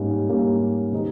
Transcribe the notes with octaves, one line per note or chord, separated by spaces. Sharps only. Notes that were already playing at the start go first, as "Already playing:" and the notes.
Already playing: G#2 G3 A#3 C#4 G4
G#2 G3 A#3 C#4 G4
D#3 G#3 C4 D#4 G4